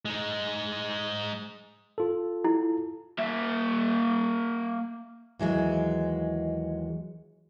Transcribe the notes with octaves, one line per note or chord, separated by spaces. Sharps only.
G#3 D#4
F4 A4
E4
A#3 E5
D#2 E3 F#3 G#3